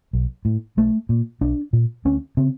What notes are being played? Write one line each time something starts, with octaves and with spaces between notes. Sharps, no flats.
B1
A2
B1 A3
A#2
B1 D4
A#2
D2 C#4
C#3 C4